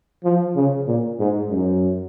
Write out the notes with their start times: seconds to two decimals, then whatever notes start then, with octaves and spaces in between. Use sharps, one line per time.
0.24 F3
0.56 C#3
0.87 A#2
1.19 G#2
1.50 F#2